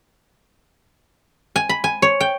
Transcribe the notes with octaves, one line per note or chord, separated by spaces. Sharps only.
G#5
B5
G#5
C#5
G5